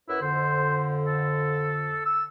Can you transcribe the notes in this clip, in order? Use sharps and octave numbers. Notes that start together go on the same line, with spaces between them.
F#2 E4 F#4 B4
F2 D3 C5
A4
E6